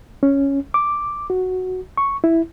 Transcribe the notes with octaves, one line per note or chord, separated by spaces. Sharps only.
C#4
D6
F#4
C#6
E4